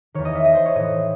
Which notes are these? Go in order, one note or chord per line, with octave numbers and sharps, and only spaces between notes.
E2 D#3 C#5
D#5
E5
D#5
C5
C#5
A2 E3 D#5